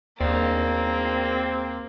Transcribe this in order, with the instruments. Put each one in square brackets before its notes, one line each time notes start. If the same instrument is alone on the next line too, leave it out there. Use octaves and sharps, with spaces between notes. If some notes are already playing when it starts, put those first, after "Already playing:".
[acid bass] D#2 [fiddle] A#3 [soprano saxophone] C4 [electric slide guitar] G#4 A#4 D5